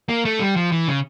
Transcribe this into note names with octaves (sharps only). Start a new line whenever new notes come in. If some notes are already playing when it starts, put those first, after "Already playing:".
A#3
A3
G3
F3
E3
C#3